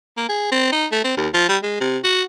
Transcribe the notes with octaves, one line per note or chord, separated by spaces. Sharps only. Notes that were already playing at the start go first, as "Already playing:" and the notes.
A#3
G#4
C4
D#4
A3
C4
D#2
F3
G3
G#3
C3
F#4